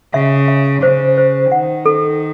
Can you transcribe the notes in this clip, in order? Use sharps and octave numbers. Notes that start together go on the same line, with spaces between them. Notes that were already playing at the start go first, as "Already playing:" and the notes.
C#3 E5
E5
C#3 C5
C5
D#3 F#5
A4